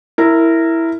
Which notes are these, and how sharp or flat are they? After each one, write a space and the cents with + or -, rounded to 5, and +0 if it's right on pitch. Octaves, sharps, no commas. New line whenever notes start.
E4 +0 A#4 -15